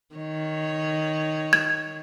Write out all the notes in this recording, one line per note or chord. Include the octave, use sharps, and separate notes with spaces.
D#3 C#5
G#6